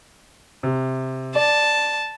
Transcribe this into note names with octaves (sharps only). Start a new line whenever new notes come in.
C3
D5 A5